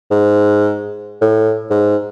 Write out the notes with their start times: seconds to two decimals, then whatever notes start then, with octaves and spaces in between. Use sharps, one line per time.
0.11 G#2
1.21 A2
1.70 G#2